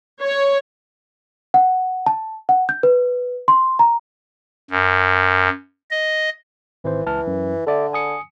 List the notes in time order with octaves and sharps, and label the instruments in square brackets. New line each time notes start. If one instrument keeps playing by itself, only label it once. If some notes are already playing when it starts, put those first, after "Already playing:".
[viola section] C#5
[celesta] F#5
A5
F#5
G6
B4
C6
A#5
[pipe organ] F#2
D#5
[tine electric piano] G#1 C5 [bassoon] E3
[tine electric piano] C#2 A5 F6 [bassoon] E3
[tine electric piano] F#2
[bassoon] D3 [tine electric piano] A4 D5 E5
[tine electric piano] G#5 D#6 C#7